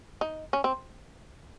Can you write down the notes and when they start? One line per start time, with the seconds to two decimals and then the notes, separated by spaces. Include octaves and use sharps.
0.21 D#4
0.53 C#4
0.64 C4